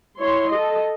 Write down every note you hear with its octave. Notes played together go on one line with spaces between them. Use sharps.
E4 C#5 C6
A4 D#5